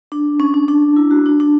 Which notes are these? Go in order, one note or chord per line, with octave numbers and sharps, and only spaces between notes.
D4
C#4
C#4
D4
E4
F#4
D4
D4